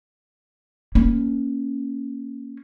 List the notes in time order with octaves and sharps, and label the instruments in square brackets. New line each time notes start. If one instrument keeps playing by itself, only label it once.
[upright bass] A#3 C#4